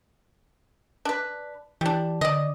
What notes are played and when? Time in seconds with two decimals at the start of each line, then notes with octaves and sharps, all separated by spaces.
1.05 D4 B4
1.81 E3 G3 D4
2.21 D3 D5 D#5